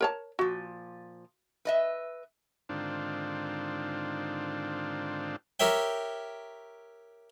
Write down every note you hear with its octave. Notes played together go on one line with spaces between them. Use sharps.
A#4 C#5 A5
A#2 F3 F#4
B4 D#5 E5
G#2 D3 D#3 C4 D4 F4
G4 A#4 C#5 E5 G5